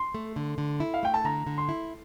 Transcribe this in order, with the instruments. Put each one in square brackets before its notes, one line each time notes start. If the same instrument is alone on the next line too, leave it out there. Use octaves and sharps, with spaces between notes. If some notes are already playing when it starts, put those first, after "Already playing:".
Already playing: [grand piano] C6
[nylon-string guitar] A3
D3
D3
E4
[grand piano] F5
[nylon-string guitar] A3 [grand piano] G5
[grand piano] A5
[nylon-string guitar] D3 [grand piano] A#5
[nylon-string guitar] D3
[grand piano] C6
[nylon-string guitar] E4